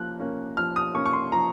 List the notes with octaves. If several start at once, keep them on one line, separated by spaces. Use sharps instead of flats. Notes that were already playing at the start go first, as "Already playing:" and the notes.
Already playing: F3 A#3 C#4 F#6
A#3 C#4
F3 F6
D#6
A#3 C#4 C#6
C#6
C6
F3 A#5